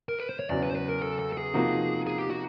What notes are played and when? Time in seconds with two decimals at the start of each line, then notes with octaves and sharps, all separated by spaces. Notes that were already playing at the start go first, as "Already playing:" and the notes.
0.09 A#4
0.19 B4
0.29 C5
0.39 C#5
0.50 E2 C#3 F#3 D5
0.63 B4
0.71 C5
0.75 B4
0.89 A#4
1.02 A4
1.19 A4
1.32 A4
1.37 G#4
1.54 C3 F3 A#3 D#4 F#4
2.07 G#4
2.19 G4
2.30 F#4